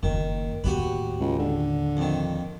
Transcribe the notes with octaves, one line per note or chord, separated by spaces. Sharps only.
F#1 D#3 A#3
D#2 A2 F#4 G4 B4
C#2
D3
F2 D#3